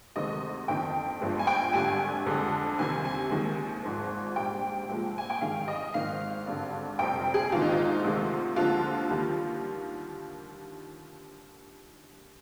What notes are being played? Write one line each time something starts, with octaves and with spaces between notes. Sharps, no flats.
D2 C3 D#3 G#3 D#5
G1 F2 D#3 G5
G1 G2 F3 G#3
G#5
G5
G#1 G2 D3 G3 G#5
F2 D3 G#3
C2 C3 D#3 G3 G#5
G#5
D#2 D#3 G#3
G#1 G#2 F3
A#1 G#2 G3 G5
C2 A#2 F3 G#3
G#5
G5
G#1 G2 D#3 G#3 F5
D#5
G#1 G#2 D#3 F5
G#1 G2 D3
F1 F2 C3 G3 G5
G#4
A#1 G#2 D#3 F4
D#4
F4
D2 C3 D#3 G#3
D#2 D3 F3 G#3 F4
D#2 D#3 G3